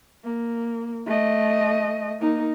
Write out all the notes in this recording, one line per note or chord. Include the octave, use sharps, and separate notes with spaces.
A#3
A3 D#5
A#3 D#4